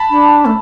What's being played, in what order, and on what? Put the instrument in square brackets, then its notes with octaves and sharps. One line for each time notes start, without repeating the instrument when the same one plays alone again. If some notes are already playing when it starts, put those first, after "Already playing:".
Already playing: [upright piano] A5 B5
[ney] D4
A3